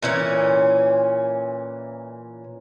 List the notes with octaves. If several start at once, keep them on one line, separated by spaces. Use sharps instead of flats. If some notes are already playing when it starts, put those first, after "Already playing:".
A#2 E3 C#4